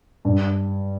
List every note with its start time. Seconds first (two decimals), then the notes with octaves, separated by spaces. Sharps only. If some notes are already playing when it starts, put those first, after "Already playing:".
0.25 G2